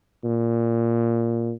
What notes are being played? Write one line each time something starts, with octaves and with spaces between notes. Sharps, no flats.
A#2